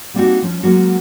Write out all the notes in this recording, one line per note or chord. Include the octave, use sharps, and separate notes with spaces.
G3 A#3 C4 D4 D#4 F#4
F3 C#4
F#3 G#3 A#3 C#4 F#4